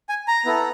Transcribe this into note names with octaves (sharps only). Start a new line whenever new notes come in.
G#5
A#5
B3 E4 A4